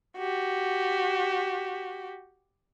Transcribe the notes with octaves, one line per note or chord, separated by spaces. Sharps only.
F#4 G4